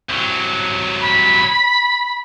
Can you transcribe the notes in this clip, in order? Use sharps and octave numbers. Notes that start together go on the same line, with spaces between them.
C2 F#3
B5